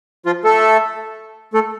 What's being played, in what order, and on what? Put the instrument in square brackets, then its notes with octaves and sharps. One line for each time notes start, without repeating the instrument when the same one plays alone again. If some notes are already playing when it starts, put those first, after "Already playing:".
[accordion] F3 F4
A3 A4
A3 A4